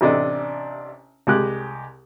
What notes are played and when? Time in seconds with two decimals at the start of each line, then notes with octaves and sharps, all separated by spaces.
0.01 A1 C3 D4 A4 D#5
1.27 C2 G#3 G4 F#6